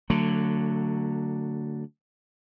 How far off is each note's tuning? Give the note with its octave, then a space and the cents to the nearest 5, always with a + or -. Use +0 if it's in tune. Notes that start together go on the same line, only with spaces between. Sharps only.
D3 +0 F#3 +0 A3 +30